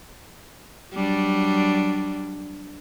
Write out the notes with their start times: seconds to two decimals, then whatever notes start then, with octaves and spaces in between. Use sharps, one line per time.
0.94 F#3 G3 D4